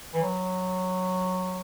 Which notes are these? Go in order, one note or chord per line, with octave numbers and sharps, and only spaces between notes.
E3
F#3